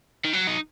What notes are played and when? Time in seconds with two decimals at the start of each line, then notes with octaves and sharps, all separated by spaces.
0.24 D#3
0.33 F#3
0.47 D#4